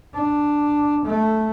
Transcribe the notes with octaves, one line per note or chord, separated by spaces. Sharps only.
D4
A3